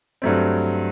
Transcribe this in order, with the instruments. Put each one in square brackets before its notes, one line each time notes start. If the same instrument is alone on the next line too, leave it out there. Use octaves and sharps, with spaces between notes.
[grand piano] G2 F#3 A3 C4